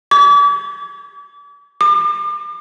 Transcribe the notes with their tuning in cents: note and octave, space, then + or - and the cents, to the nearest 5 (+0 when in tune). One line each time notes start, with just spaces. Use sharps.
D6 -40
D6 +40